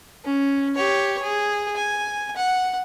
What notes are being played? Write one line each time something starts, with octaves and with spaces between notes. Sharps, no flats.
C#4
G4 C#5
G#4
G#5
F#5